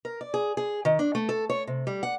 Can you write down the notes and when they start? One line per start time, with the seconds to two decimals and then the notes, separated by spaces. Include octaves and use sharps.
0.05 A#4
0.21 D5
0.34 G#4
0.57 G#4
0.85 D#3
0.99 D4
1.15 A3
1.29 A4
1.50 C#5
1.67 C3
1.87 G3
2.03 F#5